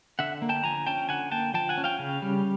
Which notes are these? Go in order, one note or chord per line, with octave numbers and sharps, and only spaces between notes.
D3 E5 F#5
A#3
G5 A5
F3 G#5 A#5
C#4 G5 A5
D3 F#5 G#5
A#3 G5 A5
F3 G5 A5
F#5 G#5
C#4
F5 G5
C#3
G3